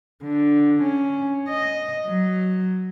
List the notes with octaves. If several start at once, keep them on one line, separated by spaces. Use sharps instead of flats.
D3
C#4
D#5
F#3